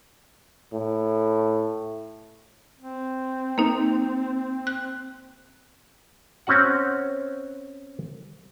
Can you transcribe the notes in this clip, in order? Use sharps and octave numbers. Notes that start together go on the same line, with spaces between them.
A2
C4
A#3 D#4
F#6
C4 C#4 F#4 F#5